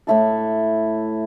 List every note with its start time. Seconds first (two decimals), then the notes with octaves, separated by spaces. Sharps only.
0.07 A2 A3 E4 A4